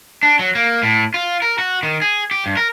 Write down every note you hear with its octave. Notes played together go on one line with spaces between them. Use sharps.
D4
F#3
A#3
A2
F4
A#4
F#4
D#3
G#4
G4
G2
A#4